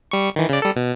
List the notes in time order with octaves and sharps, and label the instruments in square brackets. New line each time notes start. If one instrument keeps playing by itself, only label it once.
[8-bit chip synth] G3 C#6
D#3 E3
C#3 D5
G3 A4
B2